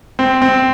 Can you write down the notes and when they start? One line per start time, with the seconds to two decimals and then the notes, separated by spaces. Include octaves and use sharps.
0.19 C4
0.42 C4